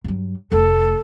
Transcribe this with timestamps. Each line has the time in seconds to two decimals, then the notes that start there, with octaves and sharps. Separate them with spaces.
0.04 G2 F#3
0.52 F1 A3 A4